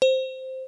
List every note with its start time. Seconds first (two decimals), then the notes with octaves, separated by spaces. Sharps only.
0.02 C5